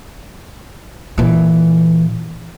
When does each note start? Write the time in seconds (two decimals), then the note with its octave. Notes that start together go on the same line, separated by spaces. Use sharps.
1.18 A#2 E3